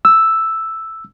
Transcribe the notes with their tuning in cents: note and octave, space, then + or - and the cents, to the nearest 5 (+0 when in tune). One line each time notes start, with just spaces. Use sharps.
E6 +0